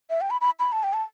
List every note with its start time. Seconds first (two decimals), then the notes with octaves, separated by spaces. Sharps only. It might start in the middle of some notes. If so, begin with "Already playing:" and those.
0.10 E5
0.21 G5
0.30 B5
0.41 B5
0.60 B5
0.72 A5
0.83 G5
0.93 A5